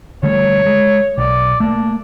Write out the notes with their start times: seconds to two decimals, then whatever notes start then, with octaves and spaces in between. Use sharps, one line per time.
0.23 D3 G3 A3 C#5
0.66 G#3
1.18 B1 D5
1.60 A3 A#3 D4